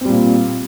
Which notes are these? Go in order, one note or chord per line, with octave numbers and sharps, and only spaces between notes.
A#2 G3 C4